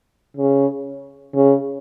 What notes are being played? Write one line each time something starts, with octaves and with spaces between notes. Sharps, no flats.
C#3
C#3